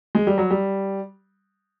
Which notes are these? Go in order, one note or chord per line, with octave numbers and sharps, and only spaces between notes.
G#3
G3
F#3
G3